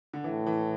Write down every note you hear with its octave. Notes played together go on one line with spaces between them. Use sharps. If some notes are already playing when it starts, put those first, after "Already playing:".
D3
A2 E3
E3